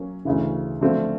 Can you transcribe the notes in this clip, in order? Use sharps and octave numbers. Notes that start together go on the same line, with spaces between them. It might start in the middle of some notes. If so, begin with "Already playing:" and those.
Already playing: F#3 A#3 C#4
D2 C#3 E3
D3 F3 A3 C4 F4